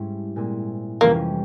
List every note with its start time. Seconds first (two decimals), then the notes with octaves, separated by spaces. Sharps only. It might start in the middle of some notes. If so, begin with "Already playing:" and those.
Already playing: G#2 G3 C#4 E4
0.36 A#2 G#3 C4 E4
1.01 F2 C3 E3 G3 A#3 C#4